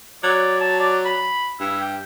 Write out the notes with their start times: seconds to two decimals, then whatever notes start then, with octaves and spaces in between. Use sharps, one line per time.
0.24 F#3 D5
0.60 A5
0.80 D5
1.05 B5
1.60 G2 E4
1.81 G5